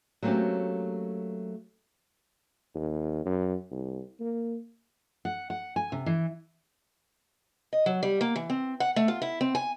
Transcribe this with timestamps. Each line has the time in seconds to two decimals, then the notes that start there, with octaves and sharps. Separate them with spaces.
0.22 F#3 A3 A#3 C4 C#4 G4
2.75 D#2
3.25 F#2
3.71 C2
4.20 A#3
5.25 F#5
5.50 F#5
5.76 G#5
5.92 C3
6.06 E3
7.73 D#5
7.86 F#3
8.03 G3
8.21 A#3
8.36 E3
8.50 C4
8.80 F#5
8.96 A3
9.08 F4
9.22 E4
9.41 C4
9.55 G#5